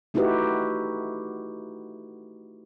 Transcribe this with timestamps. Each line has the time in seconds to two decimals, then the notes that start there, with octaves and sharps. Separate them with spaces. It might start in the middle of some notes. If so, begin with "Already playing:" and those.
0.14 A3 D#4 E4 F#4 G4 B4